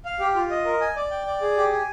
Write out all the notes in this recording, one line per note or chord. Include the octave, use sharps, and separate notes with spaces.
F5
G4
F4
D#5
A#4
G#5
D5
G5
D5
G#4
G4
G#5